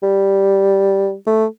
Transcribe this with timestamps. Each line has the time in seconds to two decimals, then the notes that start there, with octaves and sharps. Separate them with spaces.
0.03 G3
1.27 A3